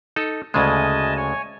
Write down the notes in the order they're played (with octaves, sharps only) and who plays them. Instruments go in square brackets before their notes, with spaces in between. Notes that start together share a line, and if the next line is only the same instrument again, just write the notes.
[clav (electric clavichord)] D#4 A4
[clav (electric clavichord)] D2 C#3 G#3 [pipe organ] D#5 G#5 A5
[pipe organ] C#5 G#5